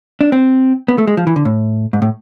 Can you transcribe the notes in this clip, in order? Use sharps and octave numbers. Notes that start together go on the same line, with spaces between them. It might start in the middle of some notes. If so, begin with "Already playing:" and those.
D4
C4
B3
A3
G#3
F3
E3
D3
A2
G#2
A2